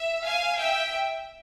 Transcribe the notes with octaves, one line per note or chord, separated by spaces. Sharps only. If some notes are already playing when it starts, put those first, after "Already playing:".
Already playing: E5
F5 G#5
E5 G5